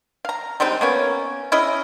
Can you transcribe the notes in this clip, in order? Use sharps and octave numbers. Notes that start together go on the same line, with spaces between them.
F5 A#5
G3 G#3 C4 D#4
A#3 B3 C#4
C#4 E4 G#4 D#5